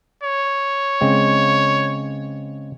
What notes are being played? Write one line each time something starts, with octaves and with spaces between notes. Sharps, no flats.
C#5
C#3 G#3 C4